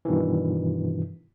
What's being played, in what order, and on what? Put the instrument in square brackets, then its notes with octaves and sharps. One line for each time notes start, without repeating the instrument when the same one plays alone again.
[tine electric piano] G2 B2 D#3 E3